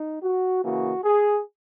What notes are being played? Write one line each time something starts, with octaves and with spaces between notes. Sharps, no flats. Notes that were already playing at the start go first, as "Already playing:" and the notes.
Already playing: D#4
F#4
C#3 E3 A#3 F#4
G#4